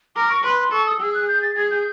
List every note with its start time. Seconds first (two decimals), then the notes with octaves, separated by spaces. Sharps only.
0.16 A#4 D6
0.29 C#6
0.44 B4 C6
0.59 C6
0.72 A4 C#6
0.86 D#6
1.00 G#4 E6
1.15 F#6
1.28 G6
1.42 A6
1.56 G#4 G#6
1.71 G6